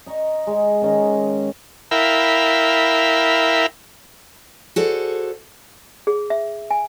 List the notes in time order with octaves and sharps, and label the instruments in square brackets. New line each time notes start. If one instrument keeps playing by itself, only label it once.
[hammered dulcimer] D#5 A#5 C#6
G#3
D#3 C#4 A#5
[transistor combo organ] E4 A#4 E5 F5 G5 B5
[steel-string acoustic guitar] F#4 G#4 A4 C5 D5
[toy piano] G#4
E5
G#5